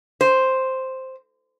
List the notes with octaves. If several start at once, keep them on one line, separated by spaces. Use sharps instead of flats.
C5